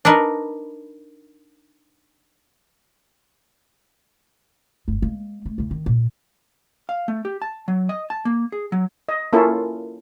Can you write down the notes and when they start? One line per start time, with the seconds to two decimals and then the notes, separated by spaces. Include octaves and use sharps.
0.05 D4 D#4 A#4 B4
4.88 F#1 G2
5.02 G#3 A#3
5.46 A3
5.58 E2 C#3
5.71 D#3
5.86 A#2
6.89 F5
7.08 A3
7.25 G4
7.42 A5
7.68 F#3
7.89 D#5
8.10 A5
8.25 A#3
8.52 G#4
8.72 F#3
9.09 D#5
9.33 A#3 C#4 E4 F4 A4